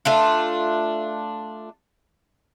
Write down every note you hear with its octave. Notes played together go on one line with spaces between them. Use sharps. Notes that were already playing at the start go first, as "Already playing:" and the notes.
A3 D4 F4